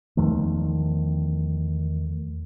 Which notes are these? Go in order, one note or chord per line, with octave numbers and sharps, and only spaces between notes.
E2 D#3 F3 A3